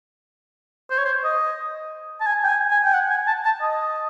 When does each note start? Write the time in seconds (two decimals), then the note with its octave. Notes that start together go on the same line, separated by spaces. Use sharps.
0.91 C5
0.98 C#5
1.05 C5
1.24 D#5
2.20 A5
2.26 G#5
2.44 G5
2.48 G#5
2.71 G#5
2.84 G5
2.94 F#5
3.10 G#5
3.27 A5
3.45 A5
3.61 D#5